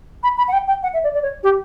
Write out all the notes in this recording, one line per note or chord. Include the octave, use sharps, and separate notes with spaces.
B5
B5
F#5
G5
G5
F#5
E5
D5
D5
C#5
G4